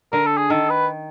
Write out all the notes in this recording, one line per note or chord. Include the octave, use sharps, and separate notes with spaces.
D3 A#4
A4
G#4
D#3 A4
B4